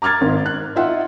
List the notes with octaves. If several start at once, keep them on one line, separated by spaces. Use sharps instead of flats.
A#5 D6 F6 G#6 A6
G#1 G#2
F#6
D#4 F4 E5 F#5